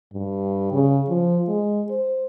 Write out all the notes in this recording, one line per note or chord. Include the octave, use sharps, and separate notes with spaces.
G2
C#3
F3
G#3
C5